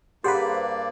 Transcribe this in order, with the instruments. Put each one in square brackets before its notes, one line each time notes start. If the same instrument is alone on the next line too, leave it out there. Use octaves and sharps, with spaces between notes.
[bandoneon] G2 A#3 D5 [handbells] G4 G#4 F#5 [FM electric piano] B4 C5